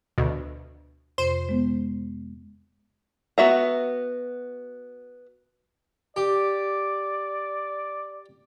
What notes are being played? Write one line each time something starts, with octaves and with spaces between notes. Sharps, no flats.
D2 B2
F2 C3 C5
G#3 B3
B3 F#4 E5 A#5
G4 D5